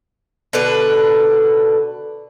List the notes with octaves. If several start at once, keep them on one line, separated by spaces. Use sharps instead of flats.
B2 D3 D4 B4